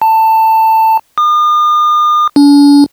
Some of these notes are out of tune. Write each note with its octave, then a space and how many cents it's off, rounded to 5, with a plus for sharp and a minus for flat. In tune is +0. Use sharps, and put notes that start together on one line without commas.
A5 +15
D#6 -45
D4 -45